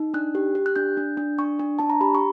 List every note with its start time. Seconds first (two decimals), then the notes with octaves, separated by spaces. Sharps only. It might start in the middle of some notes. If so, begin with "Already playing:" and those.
Already playing: D#4
0.14 D4 F#6
0.35 G4
0.55 G4
0.66 F#6
0.76 D4 G6
0.97 D4
1.17 D4
1.38 D4 C#6
1.59 D4
1.79 D4 A5
1.90 A#5
2.01 G4 B5
2.15 C#6